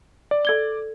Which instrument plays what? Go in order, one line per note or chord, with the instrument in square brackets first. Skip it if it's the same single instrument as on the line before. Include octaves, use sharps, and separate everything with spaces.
[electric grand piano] D5
[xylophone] A4 G#6 G7